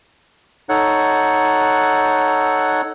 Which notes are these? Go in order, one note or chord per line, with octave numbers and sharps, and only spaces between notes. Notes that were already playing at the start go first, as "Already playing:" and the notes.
D#4 A4 C#5 F#5 F#6